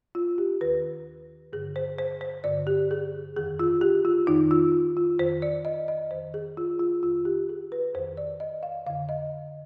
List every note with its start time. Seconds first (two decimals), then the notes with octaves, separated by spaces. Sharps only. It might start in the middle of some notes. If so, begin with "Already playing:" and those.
0.15 F4
0.38 G4
0.61 D#2 D#3 B4
1.53 G2 D3 G#4
1.76 C5
1.99 C5
2.21 C5
2.44 G2 D3 D5
2.67 G4
2.91 G#4
3.36 F2 D#3 G#4
3.60 F4
3.81 G4
4.05 F4
4.27 F2 D#3 D#4
4.51 F4
4.97 F4
5.19 F2 D#3 C5
5.42 D5
5.65 D#5
5.88 D#5
6.11 F2 D#3 C5
6.34 G#4
6.57 F4
6.79 F4
7.03 F2 D#3 F4
7.25 G4
7.49 G#4
7.72 B4
7.95 F2 D#3 C5
8.17 D5
8.40 D#5
8.63 F5
8.86 F2 D3 F5
9.09 D#5